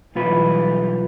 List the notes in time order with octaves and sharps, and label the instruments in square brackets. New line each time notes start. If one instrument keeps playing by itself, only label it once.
[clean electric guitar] B1 F4 B4 [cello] E3 G3